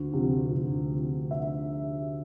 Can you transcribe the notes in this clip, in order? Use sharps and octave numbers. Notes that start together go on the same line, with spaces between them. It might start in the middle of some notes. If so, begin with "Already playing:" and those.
Already playing: D2
C3 F3
D2
C3 F3
E5